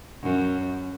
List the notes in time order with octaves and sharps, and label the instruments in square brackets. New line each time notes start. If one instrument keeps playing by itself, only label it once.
[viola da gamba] F#2